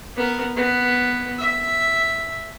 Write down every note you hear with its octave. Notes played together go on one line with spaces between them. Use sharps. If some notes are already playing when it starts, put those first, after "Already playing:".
B3 A#4
B3
E5